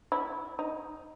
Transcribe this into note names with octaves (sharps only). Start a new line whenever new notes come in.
E4
D#4